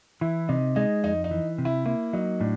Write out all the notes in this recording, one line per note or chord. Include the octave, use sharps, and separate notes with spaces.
E3 E4
C3 D#4
G#3 D#4
F2 D#4
D#4
E3
C3
E4
A#3 E4
F#3 D#4
A2 D4